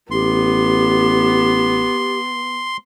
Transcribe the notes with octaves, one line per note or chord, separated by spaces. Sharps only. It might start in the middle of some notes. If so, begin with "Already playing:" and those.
A1 B3 G4 C6